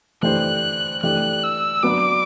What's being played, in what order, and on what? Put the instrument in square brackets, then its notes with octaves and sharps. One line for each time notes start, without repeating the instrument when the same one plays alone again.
[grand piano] E3 A3 D4 G4 C5 [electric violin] F#6
[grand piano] E3 A3 D4 G4 [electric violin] F#6
[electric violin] E6
[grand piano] F#3 B3 D4 [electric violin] D6